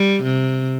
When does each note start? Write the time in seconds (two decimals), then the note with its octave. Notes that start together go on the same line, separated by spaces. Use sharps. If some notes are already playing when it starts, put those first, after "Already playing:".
Already playing: G3
0.23 C3